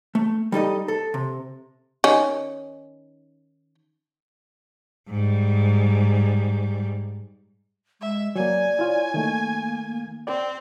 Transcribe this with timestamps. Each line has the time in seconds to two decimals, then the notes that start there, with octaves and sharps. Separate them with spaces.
0.15 A3
0.52 G3 D#4 A4 D#5
0.88 A4
1.14 C3
2.04 D#3 C#4
5.09 G#2 G3
8.01 G#3 E5
8.36 F#3 A#3 D5 G#5
8.79 E4 F4 C#5
9.14 D#3 A3 A#3
10.27 C4 D5